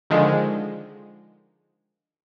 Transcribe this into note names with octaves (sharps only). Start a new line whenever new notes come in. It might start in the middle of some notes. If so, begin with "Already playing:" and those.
D3 D#3 F3 G#3